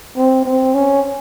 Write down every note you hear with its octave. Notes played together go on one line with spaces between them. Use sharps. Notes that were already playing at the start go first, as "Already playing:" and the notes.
C4
C4
C#4